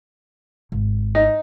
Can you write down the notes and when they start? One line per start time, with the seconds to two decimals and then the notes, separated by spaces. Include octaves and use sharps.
0.72 G#1
1.15 D#4